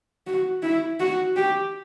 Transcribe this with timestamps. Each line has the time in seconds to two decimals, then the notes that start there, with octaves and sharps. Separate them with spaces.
0.27 F#4
0.63 E4
1.00 F#4
1.36 G4